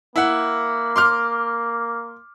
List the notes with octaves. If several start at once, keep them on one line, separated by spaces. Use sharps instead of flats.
A#3 E4 F#5
C6 D6 F6